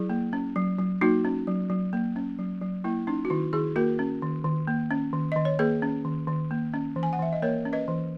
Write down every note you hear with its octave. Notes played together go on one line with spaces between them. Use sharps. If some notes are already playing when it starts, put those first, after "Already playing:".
Already playing: F#3 E4 G#4
A#3
C#4
F#3
F#3
A#3 D#4 F#4
C#4
F#3
F#3
A#3
C#4
F#3
F#3
A#3 E4
C#4 D#4
F#4
D#3 E4
D#3 E4 G#4
A#3 F#4 A#4
C#4
D#3
D#3
A#3
C#4
D#3
D#3 D#5
C#5
A#3 G#4 B4
C#4
D#3
D#3
A#3
C#4
E3
G#5
F#5
E3 E5
D#5
A#3 A#4 C#5
C#4
B4 D#5
E3